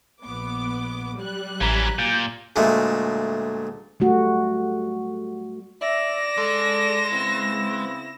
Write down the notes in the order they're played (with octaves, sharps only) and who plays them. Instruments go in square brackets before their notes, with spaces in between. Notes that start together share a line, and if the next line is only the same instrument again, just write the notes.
[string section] A#1 B3 D6
F#3 G3 F#6
[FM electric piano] A1 A#5 B6 [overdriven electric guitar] E3 C#4
[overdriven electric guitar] A#2 [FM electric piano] G6
[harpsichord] D2 A#2 G#3 A3
[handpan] G3 A3 F#4
[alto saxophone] D5 [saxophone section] E5 [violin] A#6 E7
[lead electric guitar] G#3 [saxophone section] A4
[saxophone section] C#3 B3 C4 [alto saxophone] E4